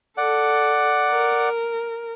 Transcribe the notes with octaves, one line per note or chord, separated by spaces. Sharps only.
A4 D5 F#5
A#4